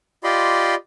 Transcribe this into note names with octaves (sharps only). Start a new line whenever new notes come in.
F4 G4 D5 D#5 B5 C6